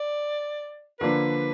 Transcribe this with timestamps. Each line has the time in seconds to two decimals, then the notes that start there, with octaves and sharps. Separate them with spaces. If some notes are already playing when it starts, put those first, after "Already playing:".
Already playing: D5
1.00 D3 F3 A#3 D4 B4